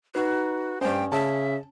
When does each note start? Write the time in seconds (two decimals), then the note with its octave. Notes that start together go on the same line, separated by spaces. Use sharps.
0.15 D#4 F#4 B4
0.81 G2 C#4 C5 G5
1.12 C#3 E5 A5